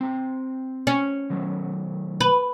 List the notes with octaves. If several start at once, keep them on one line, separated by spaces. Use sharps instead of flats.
C4 A#5
C#4
D#3 F#3 A3
B4